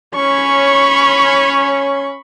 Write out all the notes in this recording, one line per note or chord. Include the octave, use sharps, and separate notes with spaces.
C#4 C#5 B5 C#6